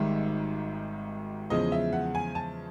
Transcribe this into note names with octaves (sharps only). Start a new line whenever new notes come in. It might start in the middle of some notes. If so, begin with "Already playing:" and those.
Already playing: G#1 G#2 D#3 G3 E5
E2 C#3 F3 G#3 D#5
E5
F#5
G#5
A5